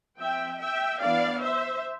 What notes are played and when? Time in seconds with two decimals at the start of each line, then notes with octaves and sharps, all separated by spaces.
0.19 F3 C4 E5 G5
0.60 E5 G5
1.01 E3 B3 D4 D5 F5
1.42 C5 E5